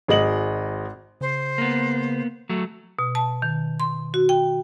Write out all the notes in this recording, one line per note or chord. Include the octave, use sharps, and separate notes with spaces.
G#1 G#3 D#5 F#7
C#3 C5
A#3 B3
F#3 A3
B2
A5
D#3
C6
F#4
G5